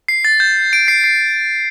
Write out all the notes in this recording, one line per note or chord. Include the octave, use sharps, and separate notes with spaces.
C7
A6
G6
D7
C7
C7